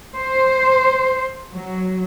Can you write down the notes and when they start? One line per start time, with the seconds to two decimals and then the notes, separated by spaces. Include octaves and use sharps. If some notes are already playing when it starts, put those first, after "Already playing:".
0.15 C5
1.53 F#3